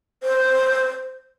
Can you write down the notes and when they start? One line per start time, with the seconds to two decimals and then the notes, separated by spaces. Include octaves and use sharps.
0.23 C5